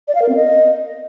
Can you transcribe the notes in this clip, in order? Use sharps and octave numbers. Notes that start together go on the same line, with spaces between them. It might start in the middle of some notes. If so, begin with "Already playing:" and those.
D5
F5
A#4
C4
D#5